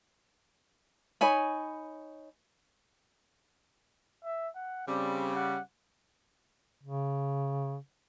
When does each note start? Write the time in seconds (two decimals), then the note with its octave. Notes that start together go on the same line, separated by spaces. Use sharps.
1.21 D#4 C#5 G#5 B5
4.24 E5
4.55 F#5
4.88 C#3 G3 C4
5.35 F#5
6.83 C#3